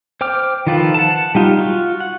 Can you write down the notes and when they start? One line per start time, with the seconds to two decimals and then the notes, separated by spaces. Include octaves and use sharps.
0.21 C5 G5 D6 F6
0.67 D#3 F3 F4 A4 B4
0.94 F#5 A5
1.35 G3 D#4 F4 G4
1.59 F4 F#4
2.00 F#5